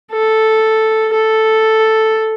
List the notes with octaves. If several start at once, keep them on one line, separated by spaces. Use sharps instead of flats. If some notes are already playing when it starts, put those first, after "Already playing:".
A4
A4